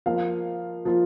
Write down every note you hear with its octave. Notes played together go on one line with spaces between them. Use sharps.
F3 A#3 F4 F5
F3 A#3 F4